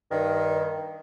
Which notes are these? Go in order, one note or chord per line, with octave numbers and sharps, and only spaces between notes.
G2 D#3